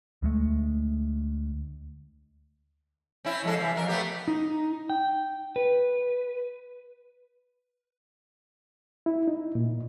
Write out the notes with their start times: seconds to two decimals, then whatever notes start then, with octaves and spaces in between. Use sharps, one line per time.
0.22 D2 G#3 A3
3.25 C4 C#4 E4
3.44 F2 G#3 A4
3.56 C3 D#3 E3
3.76 F2 F#3 A#4
3.88 A3 B3 G4
4.28 D#4
4.90 G5
5.56 B4
9.06 E4
9.28 D#4
9.55 A#2